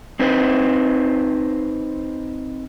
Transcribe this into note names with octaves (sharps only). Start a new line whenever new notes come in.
C4 D#4 B4 C5